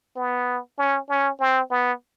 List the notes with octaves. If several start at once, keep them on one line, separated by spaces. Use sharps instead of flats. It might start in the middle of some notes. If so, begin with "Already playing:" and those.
B3
C#4
C#4
C4
B3